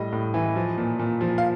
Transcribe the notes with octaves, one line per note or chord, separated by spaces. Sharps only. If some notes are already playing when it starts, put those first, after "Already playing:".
Already playing: A2 G3 D#5
A2
E3
F3
A#2
A#2
F3
F5